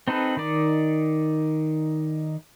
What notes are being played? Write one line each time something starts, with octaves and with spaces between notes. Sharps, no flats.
C4 D#4 A4 B4
D#3 D#4 D5